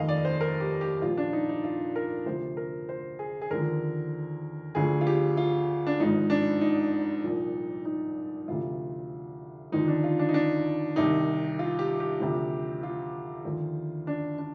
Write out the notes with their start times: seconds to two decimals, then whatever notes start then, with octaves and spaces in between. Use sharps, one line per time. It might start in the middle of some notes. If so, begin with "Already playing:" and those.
Already playing: F1 D#2 D#3 D#5 F5
0.09 D5
0.25 C5
0.41 A#4
0.60 G4
0.81 G4
1.02 A#1 A#2 F3 F4
1.17 D4
1.33 D#4
1.49 D#4
1.64 F4
1.96 A#4
2.26 D2 C3 F3 C5
2.57 A#4
2.89 C5
3.19 G#4
3.42 G#4
3.51 D#2 D3 F3 A#4
4.75 D2 D3 F3 G#4
5.01 F4
5.07 G4
5.37 F4
5.87 D4
6.00 G#1 G#2 F3 D#4
6.30 D4
6.61 D#4
7.24 C2 A#2 F3
7.85 D#4
8.48 D2 C3 F3 F4
9.72 D#2 D3 F3 D#4
9.88 D4
10.04 F4
10.19 D4
10.29 D#4
10.34 D4
10.96 C2 C3 D#3 D#4
11.59 F4
11.79 G4
12.00 G4
12.20 D2 C3 F3
12.83 F4
13.45 D#2 D3 F3
14.07 D4
14.39 D4